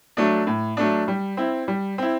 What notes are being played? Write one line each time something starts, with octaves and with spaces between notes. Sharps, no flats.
F#3 A3 D4
A2
F#3 A3 D4
G3
C4 E4
G3
C4 E4